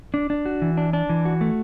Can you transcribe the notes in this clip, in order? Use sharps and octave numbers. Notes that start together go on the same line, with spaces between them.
D4
D4
F#4
E3
D4
D4
E3
F#4
A3